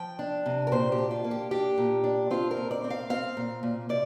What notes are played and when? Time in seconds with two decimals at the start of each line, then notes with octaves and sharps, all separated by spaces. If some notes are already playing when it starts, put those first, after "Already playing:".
Already playing: F3 G5
0.19 D4
0.46 C3
0.67 A#4
0.72 A#2 C5
0.92 G4
0.98 D4
1.11 F4
1.24 A#3
1.31 G4
1.51 D4 G4
1.78 A#2
2.04 D4
2.31 C4 F4
2.51 A#4
2.57 A#2
2.71 D5
2.84 C4
2.90 F5
3.10 C4 F5
3.37 A#2
3.63 A#2
3.89 C3 D5